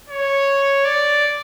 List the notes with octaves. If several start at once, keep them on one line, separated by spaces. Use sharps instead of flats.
C#5
D5